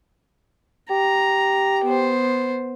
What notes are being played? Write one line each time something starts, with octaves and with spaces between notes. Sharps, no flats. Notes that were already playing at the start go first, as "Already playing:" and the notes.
G4 A#5
B3 C5